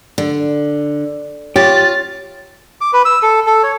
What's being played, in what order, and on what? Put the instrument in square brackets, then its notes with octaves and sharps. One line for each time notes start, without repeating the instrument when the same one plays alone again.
[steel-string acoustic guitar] D3
[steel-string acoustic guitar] F4 [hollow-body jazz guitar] G4 [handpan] C#5 [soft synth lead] A6
[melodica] D6
B4
E6
A4
A4
C#5